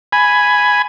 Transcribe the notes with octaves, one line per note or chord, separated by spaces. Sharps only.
G#5 B5